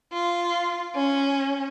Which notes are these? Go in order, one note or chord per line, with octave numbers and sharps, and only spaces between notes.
F4
C#4